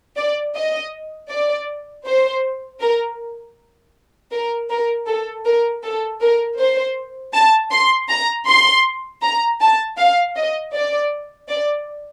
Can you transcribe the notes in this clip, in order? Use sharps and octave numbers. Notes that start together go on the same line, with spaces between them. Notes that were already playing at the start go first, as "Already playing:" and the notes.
D5
D#5
D5
C5
A#4
A#4
A#4
A4
A#4
A4
A#4
C5
A5
C6
A#5
C6
A#5
A5
F5
D#5
D5
D5